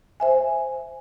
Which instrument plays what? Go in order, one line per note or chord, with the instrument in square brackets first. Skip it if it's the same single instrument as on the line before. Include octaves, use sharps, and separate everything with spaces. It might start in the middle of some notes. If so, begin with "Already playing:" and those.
[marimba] C5 E5 G#5